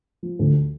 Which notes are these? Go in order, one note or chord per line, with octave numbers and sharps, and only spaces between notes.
F3
D2